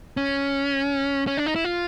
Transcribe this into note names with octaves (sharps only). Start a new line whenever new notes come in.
C#4
C#4
D4
D#4
E4
F4